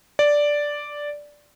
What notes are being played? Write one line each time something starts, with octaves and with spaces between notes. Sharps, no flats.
D5